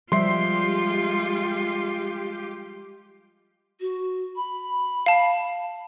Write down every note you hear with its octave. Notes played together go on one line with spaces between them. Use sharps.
F3 G3 G#3 F4 G4 E5 C6 C7
F#4
B5
F5 A5